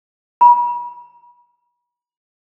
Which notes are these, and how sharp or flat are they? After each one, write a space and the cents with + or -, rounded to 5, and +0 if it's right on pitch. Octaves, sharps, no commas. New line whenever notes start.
B5 -40